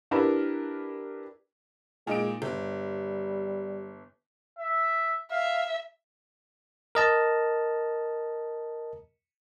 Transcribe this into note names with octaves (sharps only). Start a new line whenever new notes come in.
D4 E4 G4 A#4 B4
A#2 G#3 D#4 D7
G1 G3
E5
E5 F5
A#4 D#5 A5